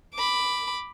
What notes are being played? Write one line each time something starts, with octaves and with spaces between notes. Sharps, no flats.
B5 D6